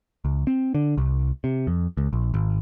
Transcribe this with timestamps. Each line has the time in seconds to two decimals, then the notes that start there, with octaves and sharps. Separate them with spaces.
0.25 C#2
0.47 C4
0.75 D3
0.98 C2
1.44 C3
1.67 F2
1.97 C#2
2.13 A#1
2.34 G#1